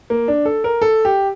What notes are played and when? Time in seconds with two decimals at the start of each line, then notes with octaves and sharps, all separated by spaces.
0.10 A#3
0.28 D4
0.45 A4
0.64 A#4
0.82 A4
1.05 G4